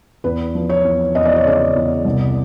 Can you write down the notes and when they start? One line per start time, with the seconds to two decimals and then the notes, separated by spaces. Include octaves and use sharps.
0.24 E2 B4
0.55 F3
0.69 C#5
0.85 E2
1.15 E2 D#5
1.25 D5
1.36 C#5
1.45 C#3 D5
1.75 E2
2.05 C2